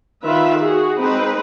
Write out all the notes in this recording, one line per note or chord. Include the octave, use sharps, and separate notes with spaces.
D#3 F4 B4 E5
F#4 G#4
G#3 C4 D#4 B4